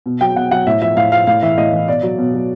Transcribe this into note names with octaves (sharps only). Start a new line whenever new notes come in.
B2
F#3 G5
B2 F#5
F#3 F#5
A2 E5
F3 E5
A2 F5
F3 F5
A2 F5
E3 E5
A2 D#5
E3
B2 D5
F#3
B2
F#3